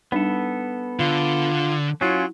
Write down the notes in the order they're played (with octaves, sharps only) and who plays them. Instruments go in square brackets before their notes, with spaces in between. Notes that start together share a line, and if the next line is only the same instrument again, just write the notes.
[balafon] G3 D4 D#4 [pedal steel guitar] B3 A4
[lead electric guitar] D3 [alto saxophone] F4
[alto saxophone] F#3 [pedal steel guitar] C#4 F4 [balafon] E4